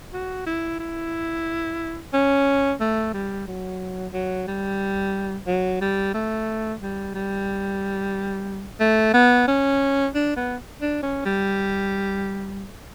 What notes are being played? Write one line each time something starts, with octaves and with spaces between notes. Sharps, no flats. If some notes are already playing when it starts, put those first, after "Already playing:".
F#4
E4
E4
C#4
A3
G3
F#3
F#3
G3
F#3
G3
A3
G3
G3
A3
B3
C#4
D4
B3
D4
C#4
G3